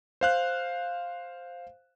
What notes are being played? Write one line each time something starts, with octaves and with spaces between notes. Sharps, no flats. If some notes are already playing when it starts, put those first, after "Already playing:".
C5 F5 F#6